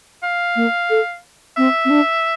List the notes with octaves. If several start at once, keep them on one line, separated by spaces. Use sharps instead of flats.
F5
A#3
A4
C4 E5
C4
D4